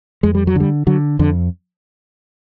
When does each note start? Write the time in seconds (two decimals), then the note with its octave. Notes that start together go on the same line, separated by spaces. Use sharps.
0.23 F2 G#3
0.35 G3
0.47 F#3
0.55 D3 G3
0.87 D3 F#3
1.19 F2 D3